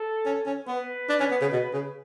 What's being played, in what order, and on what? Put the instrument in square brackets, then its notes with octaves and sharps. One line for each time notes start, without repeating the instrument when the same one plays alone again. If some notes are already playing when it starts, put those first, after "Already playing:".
Already playing: [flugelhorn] A4
[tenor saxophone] C#4
C#4
[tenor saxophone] B3 [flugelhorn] B4
[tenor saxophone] D4
C#4
B3
C#3
B2
C#3